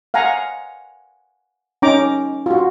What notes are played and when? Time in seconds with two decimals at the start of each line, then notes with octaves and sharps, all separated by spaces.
0.14 F5 F#5 G#5 A#5
1.82 C#4 D#4 G5 A#5 D6
2.46 F4 F#4